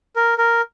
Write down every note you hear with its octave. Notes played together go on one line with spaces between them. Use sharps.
A#4
A#4